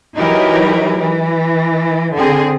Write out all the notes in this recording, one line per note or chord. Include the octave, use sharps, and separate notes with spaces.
E3 F#3 D#4 E4 G4 A#4
E3
D3 C4 G#4